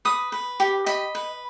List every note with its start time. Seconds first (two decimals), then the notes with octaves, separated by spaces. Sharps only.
0.05 B4 D#6
0.32 B4
0.60 G4
0.86 D#5 B5
1.15 B4